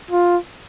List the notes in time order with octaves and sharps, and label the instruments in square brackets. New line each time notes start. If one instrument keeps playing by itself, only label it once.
[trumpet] F4